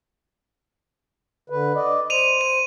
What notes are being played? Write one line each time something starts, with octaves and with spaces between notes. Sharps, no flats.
D3 B4
D5 D#5
C5 D#7 F7
D#7